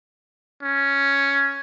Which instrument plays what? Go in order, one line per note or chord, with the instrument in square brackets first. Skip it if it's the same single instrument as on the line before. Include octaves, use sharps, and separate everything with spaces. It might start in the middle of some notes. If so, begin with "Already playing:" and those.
[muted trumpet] C#4